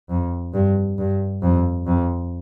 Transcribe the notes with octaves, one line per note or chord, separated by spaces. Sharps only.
F2
G2
G2
F2
F2